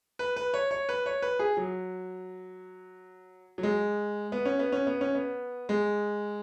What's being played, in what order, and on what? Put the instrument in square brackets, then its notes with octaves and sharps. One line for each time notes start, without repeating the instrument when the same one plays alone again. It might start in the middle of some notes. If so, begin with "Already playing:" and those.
[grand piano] B4
B4
C#5
C#5
B4
C#5
B4
G#4
F#3
F#3
G#3
B3
C#4
B3
C#4
B3
C#4
B3
G#3